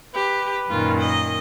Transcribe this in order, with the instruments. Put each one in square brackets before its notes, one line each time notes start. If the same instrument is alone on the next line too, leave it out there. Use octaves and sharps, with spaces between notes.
[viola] G4 [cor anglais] B4
[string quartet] F#2 A#2 D#3 [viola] F4
[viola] D#5